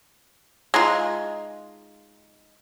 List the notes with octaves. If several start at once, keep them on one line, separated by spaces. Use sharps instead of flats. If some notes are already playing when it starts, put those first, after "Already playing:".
G#3 D#4 F4